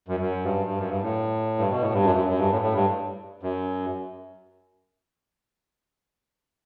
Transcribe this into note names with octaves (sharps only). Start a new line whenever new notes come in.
F#2
F#2
G2
G2
F#2
G2
A2
G2
B2
A2
G2
F#2
F#2
F#2
G2
A2
A2
G2
F#2